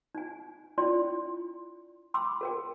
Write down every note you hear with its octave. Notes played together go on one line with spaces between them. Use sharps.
D#4 G#5
D4 E4 F4 D5 G5 C6
G5 B5 C6 D6 E6
A4 A#4 G5